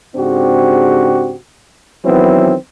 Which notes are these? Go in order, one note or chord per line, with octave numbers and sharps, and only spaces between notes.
G#2 C#3 C4 D4 F#4 G4
D#3 E3 F#3 B3 C4 E4